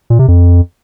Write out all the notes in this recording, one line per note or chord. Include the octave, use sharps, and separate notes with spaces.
A#2
C3
F2